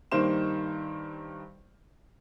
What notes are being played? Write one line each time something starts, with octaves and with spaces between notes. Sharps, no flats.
G2 D#3 A#3 C5 E7